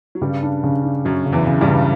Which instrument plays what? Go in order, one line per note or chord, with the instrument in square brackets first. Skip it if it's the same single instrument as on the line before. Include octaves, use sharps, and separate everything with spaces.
[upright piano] F#3
[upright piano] G2 G3 [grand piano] C#3
[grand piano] D4
C#3
D4
[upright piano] F#2 F#3 [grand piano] C#3
[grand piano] C#3
[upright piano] E2 E3
[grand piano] C#3
[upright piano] G2 G3
[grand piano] C#3